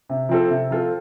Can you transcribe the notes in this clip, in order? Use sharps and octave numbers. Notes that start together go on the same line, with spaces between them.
C3
F3 C4 F4 A4
C3
F3 C4 F4 A4